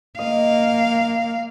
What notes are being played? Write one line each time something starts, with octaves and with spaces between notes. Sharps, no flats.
A#3 D#5 F5